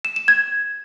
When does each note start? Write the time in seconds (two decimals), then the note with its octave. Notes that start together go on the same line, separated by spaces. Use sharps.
0.05 E7
0.16 E7
0.28 G#6